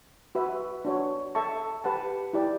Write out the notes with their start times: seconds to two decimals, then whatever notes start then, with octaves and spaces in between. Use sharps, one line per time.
0.35 F#4 B4 E5
0.85 D4 F#4 C#5
1.35 A4 E5 A5 C#6
1.84 G4 B4 F#5 A5
2.33 E4 G4 D5